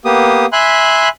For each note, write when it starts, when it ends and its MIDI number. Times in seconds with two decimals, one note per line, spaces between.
0.05 0.46 58
0.05 0.46 59
0.05 0.46 67
0.05 0.46 87
0.53 1.09 76
0.53 1.09 80
0.53 1.09 83
0.53 1.09 84
0.53 1.09 90